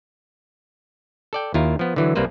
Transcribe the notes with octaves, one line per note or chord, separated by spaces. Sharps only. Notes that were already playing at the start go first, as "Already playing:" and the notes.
A4 D5 G5
D#2 E4 F4 A#4
F3 B3
D3 E3 F#3
C2 G3 A#3 C4 B4 C5